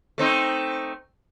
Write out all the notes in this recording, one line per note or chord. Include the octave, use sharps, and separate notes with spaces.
A3 C4 D#4